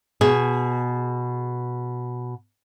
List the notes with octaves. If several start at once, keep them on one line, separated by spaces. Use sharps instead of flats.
B2 G#4